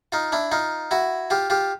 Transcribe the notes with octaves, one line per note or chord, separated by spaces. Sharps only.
D#4 F4
D4 E4
D#4 F4
E4 F#4
F4 G4
F4 G4